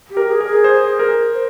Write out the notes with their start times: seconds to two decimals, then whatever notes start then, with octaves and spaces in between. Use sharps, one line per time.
0.10 G4
0.17 A#4
0.29 G#4
0.41 A#4
0.46 G#4
0.64 C5
0.99 A#4
1.34 C5